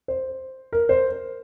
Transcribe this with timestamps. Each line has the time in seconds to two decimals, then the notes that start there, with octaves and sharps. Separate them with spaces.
0.08 C5
0.73 A#4
0.89 C5